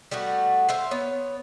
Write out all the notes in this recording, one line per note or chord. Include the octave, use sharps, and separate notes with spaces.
G3 A3 B3 F#4
C5 E5 F5
B3 C#5